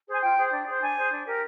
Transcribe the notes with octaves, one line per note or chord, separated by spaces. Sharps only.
G#4 C5 G#5
F4 G5
G#4 C5
D4
G#4 C5
D4 G#5
G#4 C5
D4
G4 A#4